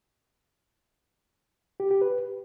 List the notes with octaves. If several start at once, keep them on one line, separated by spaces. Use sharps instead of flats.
G4
G4
B4